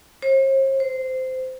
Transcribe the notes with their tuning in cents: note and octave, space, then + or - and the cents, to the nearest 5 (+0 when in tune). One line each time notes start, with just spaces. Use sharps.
C5 +45
C5 -15